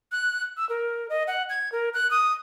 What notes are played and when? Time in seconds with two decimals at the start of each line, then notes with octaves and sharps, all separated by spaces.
0.12 F#6
0.57 E6
0.69 A#4
1.10 D#5
1.27 F#5
1.50 G#6
1.72 A#4
1.94 F#6
2.11 D#6